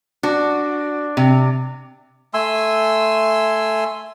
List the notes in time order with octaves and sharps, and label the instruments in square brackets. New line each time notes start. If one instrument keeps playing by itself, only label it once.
[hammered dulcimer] D4 [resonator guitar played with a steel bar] F#4
[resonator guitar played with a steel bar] C3
[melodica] A3 G#5 C6 E6